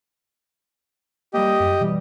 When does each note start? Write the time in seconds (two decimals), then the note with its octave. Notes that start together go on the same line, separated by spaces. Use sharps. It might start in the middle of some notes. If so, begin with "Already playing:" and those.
1.34 G3 A#3 G4 D#5
1.60 F#2
1.80 B2 E3 G3